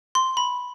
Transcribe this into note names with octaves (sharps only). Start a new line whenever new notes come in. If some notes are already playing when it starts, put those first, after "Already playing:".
C6
B5